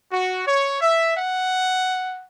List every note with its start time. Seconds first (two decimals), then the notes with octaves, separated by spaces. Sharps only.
0.11 F#4
0.46 C#5
0.81 E5
1.15 F#5